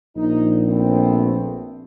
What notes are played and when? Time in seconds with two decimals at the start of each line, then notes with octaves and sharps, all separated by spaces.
0.16 A#1 D#4
0.66 A3 B3 C4